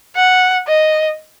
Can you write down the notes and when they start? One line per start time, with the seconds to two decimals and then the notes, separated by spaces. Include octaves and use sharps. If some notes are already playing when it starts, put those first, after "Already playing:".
0.15 F#5
0.68 D#5